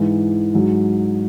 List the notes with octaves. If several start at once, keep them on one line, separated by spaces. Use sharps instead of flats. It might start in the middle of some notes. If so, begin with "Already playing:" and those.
Already playing: G#2 E3
G#2 F#3